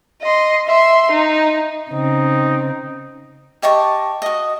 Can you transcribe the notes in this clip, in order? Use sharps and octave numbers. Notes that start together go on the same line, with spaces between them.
D#5 C6
E5 C6
D#4
C#3 C4 D#4
G4 D#5 A5 C#6
F#4 D#5